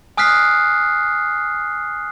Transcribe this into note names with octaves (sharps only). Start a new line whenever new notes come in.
G#5 D#6 F6 F#6 B6 C7